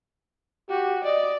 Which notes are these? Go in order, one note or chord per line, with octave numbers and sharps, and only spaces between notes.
F#4 G4
D5 D#5